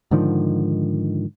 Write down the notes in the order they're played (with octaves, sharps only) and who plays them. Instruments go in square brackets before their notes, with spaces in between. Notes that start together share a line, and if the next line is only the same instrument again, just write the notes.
[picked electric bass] G#2 D3 D#3 F3